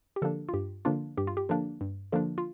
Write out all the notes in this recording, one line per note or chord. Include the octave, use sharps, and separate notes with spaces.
G4
D3 F3 A#3 D4 A4
F4
G2 G4
D3 F3 A#3 D4 F4
G2 G4
F4
G4
D3 F3 A#3 D4
G2
D3 F3 A#3 D4
F4